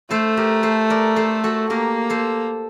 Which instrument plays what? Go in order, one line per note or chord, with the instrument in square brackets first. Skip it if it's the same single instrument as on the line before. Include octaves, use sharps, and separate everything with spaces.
[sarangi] A3 [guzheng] A4 C5
[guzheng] G4 A#4
A4 C5
A#4 D5
A4 C5
F#4 A4
[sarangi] A#3 [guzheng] G4 A#4
[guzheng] A4 C5